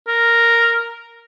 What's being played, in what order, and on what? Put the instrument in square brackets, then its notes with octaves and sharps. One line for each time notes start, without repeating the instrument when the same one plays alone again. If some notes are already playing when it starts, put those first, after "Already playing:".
[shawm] A#4